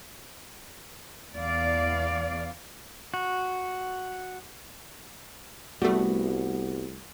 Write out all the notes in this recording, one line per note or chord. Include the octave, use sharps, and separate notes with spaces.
E2 D5 F5
F#4
C2 G3 A3 B3 F#4